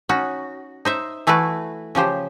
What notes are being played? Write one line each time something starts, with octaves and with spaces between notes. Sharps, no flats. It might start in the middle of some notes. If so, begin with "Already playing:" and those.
C#4 D#4 F#4
D#4 C5 E5
E3 A3 E4 F#4 B4
C#3 F3 G4 C5